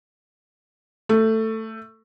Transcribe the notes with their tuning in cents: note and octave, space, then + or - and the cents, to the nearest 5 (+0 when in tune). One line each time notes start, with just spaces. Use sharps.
A3 +10